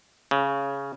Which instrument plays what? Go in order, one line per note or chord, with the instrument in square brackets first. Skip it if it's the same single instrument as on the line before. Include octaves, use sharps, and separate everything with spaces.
[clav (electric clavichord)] C#3